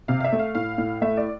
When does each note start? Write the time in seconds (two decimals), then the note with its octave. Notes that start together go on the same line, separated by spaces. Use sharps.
0.08 C3 F5
0.20 F5
0.24 E5
0.32 A3
0.39 F5
0.55 A2 F5
0.78 A2
1.02 A3 E5
1.17 D5